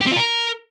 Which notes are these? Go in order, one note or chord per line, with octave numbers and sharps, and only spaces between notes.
G4
C4
F4
A#4